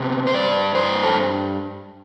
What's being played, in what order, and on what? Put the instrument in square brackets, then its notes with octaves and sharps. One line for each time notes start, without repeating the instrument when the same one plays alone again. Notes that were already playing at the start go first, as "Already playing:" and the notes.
Already playing: [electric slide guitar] C3 B3
C5
G2 D5
G2 C5
A4